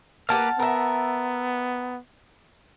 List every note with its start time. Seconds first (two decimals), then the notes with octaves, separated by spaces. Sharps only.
0.29 A#3 G4 B4 F#5 A5 F6
0.60 B3 A#4 E5